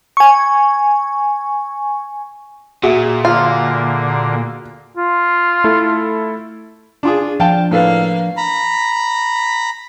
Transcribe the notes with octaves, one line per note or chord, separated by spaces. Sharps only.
G#5 C#6
A#2 F#4 G#4 E5
D3 A#3 F4
F4
A3 E4 A4
D4 F4 G#4
F3 D4 F5 G5 A5
A2 A#3 A4 B4 F5
A#5 B5